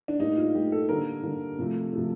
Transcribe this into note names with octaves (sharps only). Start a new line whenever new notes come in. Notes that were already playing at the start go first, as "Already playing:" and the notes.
D4
A2 G3 A#3 D#4
F4
A2 G3 A#3 G4
A4
D3 G3 A#3 A#4
D3 G3 A#3
C3 F3 A3
C3 F3 A3